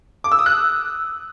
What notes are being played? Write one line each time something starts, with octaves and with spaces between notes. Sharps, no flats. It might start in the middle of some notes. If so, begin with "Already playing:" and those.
D6
E6
D#6
F#6